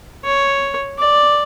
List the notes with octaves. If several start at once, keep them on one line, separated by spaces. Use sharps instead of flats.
C#5
D5